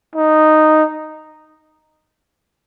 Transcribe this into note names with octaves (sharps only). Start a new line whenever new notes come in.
D#4